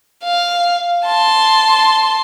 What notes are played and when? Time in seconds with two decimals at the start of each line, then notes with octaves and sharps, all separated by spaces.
0.24 F5
1.05 A5 C6